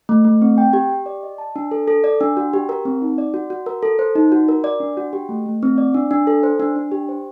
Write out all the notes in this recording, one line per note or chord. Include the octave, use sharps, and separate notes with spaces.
A3
A3
C4
G5
G4
G4
D5
D#5
A5
D4
A4
A4
D5
D4
F#4
G4
A#4
C4
D#4
D5
F#4
F#4
A#4
A4
C5
D#4
F#4
A#4
D5
D4
F#4
G4
A3
A3
C4
D5
D4
D4
A4
C5
D4
D4
G4
C5